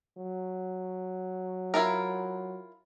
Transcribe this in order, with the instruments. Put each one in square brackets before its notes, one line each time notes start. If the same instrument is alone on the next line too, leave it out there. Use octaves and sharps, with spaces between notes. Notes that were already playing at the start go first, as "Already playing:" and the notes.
[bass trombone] F#3
[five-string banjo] E4 F4 A#4